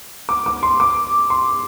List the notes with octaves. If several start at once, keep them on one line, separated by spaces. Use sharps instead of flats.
D6
D6
C6
D6
C6